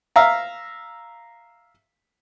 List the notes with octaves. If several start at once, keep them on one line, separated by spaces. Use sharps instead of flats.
E5 F5 A#5